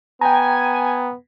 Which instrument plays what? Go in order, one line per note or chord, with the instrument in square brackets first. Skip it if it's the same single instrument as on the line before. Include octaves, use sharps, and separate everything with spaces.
[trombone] B3 [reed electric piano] G5 A#5 [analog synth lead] G#5